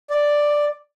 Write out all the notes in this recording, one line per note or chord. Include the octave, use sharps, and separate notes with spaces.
D5